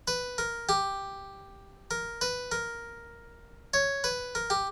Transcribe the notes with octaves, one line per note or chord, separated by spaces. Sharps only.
B4
A#4
G4
A#4
B4
A#4
C#5
B4
A#4
G4